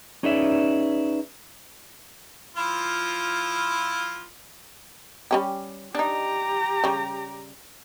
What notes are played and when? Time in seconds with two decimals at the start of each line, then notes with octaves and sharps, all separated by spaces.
0.23 C#4 D#4 G#4 B4 D5 E5
2.56 F3 E4 F4
5.31 G3 C#4 G4
5.95 D4 D#4 G4 A#5
6.84 C#3 G3